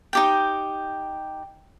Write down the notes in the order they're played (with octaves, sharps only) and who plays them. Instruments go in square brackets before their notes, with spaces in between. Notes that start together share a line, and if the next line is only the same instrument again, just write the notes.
[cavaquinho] D#4 G4 G5